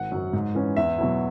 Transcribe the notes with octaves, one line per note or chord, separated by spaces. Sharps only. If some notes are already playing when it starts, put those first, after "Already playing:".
Already playing: G#1 F#5
F#2 F#3
G#2
E3 C#4
E2 E5
B2 F#3 E4